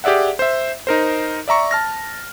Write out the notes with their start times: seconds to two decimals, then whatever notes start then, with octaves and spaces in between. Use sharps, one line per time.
0.04 G4 G#4 D5 E5 F#5
0.39 C5 E5
0.87 D#4 A#4 C5
1.48 D5 E5 A#5 C#6
1.71 A5 F6 A#6